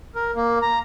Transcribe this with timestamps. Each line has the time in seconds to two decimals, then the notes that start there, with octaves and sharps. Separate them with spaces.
0.15 A#4
0.35 A#3
0.62 A#5